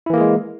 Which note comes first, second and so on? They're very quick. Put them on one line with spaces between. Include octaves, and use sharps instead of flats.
E4 E3 A#3 G#4 G#3